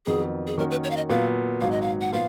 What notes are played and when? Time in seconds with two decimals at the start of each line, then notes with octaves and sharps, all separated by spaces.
0.06 F2 D#3 F#3 B3 G#4
0.47 G#4
0.58 D#3 A#3 C#4 F#4 A#4
0.71 B4
0.84 C#5
0.91 F5
0.97 D#5
1.10 A#2 F#3 B3 F5
1.61 G#1 G#2 F#3 F5
1.71 D#5
1.82 F5
2.01 F#5
2.12 A#2 F3 B3 F4 F5